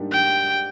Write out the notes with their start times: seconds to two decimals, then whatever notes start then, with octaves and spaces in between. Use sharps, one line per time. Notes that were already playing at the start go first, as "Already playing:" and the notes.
Already playing: G#2 G3 A#3 D4 G4
0.12 G5